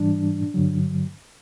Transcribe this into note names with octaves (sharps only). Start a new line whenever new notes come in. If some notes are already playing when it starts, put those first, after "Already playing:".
Already playing: G#2 E3 G3 D4
G2 D3 F#3